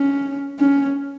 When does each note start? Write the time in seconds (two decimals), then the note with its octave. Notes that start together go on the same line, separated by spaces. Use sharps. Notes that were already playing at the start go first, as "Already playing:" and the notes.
Already playing: C#4
0.59 C#4